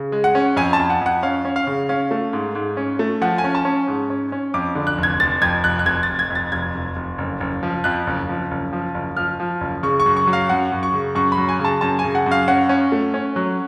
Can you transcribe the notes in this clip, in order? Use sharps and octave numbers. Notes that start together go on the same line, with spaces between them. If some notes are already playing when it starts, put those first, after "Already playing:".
Already playing: C#3
G#3
F#5
C#4
F2 G#5
A5
F2
F#5
F2 F#5
C#4 F5
C#4
F5
C#3
C#4 F5
A3
G#2
G#2
C#4
A3
F3 F#5
G#5
C#4
A5
C#4
G#2
C#4
C#4
F2 D6
D3
F#6
F1
G#6
F1 A6
F2 G#6
F1 F#6
F#6
F1 G#6
A6
F1
G#6
F2
A6
F1 G#6
F1
F1
F#1
F#1
F3
F2 F#6
F#1
F3
F#1
F3
F#1
F3 F6
F3
F#1
C#3 C#6
C#6
F#2
C#6
F#3
F5
F#2 F#5
F#2
C#6
C#3
F#2 C#6
B5
F#3
G#5
C#3
A5
F#2 A5
G#5
C#3
F#5
F#2
F5
C#4 F#5
C#4
A3
C#4
F#3